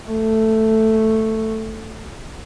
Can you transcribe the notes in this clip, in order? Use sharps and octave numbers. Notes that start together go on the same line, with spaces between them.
A3